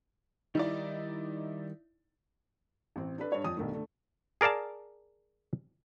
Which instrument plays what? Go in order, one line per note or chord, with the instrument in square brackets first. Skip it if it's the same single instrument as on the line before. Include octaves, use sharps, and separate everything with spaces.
[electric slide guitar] D#3 G3 [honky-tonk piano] D#4 E4 D5
[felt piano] A1 C4
D4 A4 B4
G2 C#5
F2 D#6
B1 G2 D#3 A3
D3 A3
[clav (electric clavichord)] G#4 A#4 D5 F5 A5